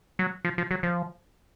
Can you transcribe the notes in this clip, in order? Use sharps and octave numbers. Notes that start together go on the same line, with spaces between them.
F#3
F3
F3
F#3
F3